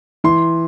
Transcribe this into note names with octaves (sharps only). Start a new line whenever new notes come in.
E3 C6